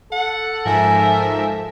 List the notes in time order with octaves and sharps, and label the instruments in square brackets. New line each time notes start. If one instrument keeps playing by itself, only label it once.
[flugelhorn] A4 [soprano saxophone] F#5
[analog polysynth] G#2 F3 E5 [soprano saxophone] A#4 [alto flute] G#5